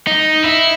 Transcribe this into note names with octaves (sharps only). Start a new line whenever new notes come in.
D#4
E4